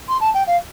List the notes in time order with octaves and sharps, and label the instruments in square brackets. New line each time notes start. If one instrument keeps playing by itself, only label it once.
[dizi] C6
A5
G5
F5